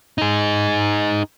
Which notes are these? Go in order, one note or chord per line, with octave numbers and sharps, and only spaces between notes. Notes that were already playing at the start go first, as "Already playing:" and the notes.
D#4 G#4